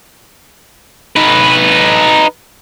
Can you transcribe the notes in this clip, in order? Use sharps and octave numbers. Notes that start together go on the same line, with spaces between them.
D#4 B4